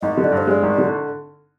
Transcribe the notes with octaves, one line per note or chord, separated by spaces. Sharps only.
G#1 D#5
D3
D5
G2
C5
G#3 D5
G#1
D3